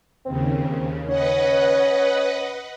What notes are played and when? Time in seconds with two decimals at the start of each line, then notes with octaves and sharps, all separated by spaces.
0.25 D#2 C#3 C4
1.08 C#4 B4 D#5 F#5